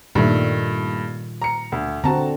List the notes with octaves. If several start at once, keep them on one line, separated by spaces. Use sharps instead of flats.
G2 A#2 D#3 G3 A3
A#5 C#7
D2
D3 C4 F#4 A5 A#5